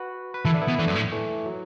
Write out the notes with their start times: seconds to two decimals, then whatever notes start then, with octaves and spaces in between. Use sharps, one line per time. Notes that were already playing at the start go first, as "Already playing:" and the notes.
Already playing: F#4 B4
0.34 B4
0.45 E3 E4 A4
0.54 D4
0.61 B3 E4
0.68 B2
0.79 E3 A3 D4
0.87 F#2
0.95 A2
1.12 E3 A3
1.46 F#3